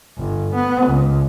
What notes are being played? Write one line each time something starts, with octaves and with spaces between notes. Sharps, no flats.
G1
B3
C#2